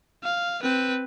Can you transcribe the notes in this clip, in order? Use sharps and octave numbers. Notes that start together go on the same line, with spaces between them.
F5
C4 B4